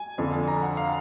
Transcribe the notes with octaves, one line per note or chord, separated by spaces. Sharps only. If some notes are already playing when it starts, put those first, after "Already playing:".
Already playing: G#5
F2 D3 F3
A#5
F#5
F5